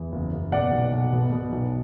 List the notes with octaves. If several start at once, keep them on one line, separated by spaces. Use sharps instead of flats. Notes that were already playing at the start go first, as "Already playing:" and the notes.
Already playing: E2
F#1
F#1
B2 D5 F#5
B1
B1
B2
B2
B1